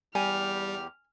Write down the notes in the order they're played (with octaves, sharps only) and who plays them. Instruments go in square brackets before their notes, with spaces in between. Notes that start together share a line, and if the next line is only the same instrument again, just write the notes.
[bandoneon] E2 G4 [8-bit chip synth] G3 [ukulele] G#5 [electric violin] F6